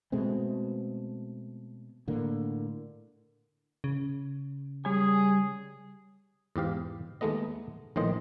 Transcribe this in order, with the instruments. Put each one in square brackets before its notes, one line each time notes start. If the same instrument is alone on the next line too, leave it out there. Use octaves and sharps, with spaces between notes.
[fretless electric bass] B2 G#3 A3 C4
A2 D3 A#3
[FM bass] C#3
[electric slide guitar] G3 C#5 G#5 [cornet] G#4
[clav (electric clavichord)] E2 G#2 G4 F5
D#2 G#3 A3 B3 D#5
A#1 A2 D#3 C5 D#5